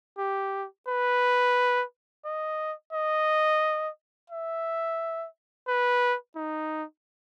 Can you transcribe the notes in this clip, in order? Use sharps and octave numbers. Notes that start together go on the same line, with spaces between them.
G4
B4
D#5
D#5
E5
B4
D#4